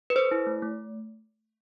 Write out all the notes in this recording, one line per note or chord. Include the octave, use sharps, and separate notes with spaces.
B4
A4 C5
E4
A3
A3